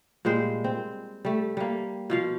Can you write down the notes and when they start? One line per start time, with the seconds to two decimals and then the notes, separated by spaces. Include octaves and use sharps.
0.25 A#2 G3 G#3 C5
0.64 C4
1.25 G3 A3
1.57 G3 A#3
2.10 B2 F3 F5